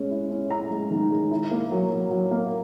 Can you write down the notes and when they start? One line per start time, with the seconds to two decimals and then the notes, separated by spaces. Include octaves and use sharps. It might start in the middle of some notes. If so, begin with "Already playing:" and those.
Already playing: G#3 C#4
0.10 E4
0.30 C#4
0.50 E4 A#5
0.70 G#3
0.91 D#3
1.10 G#3
1.31 E4
1.51 A#3
1.72 F#3
1.91 F#3
2.11 F#3
2.31 A#3